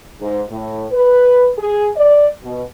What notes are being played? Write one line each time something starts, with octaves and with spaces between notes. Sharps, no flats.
G#2
A2
B4
G#4
D5
B2